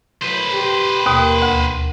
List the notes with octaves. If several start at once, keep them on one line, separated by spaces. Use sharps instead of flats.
A2 F#3 B4 C5
G4
D#2 B2 A#3
D2